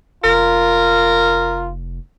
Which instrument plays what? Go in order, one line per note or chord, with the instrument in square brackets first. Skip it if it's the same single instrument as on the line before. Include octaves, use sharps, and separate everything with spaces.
[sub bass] F1 [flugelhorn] F4 [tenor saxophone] A#4